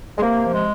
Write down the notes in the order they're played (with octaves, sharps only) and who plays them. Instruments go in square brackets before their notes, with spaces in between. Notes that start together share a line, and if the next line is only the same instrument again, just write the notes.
[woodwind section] G#3
C3 A#3
F3
G#3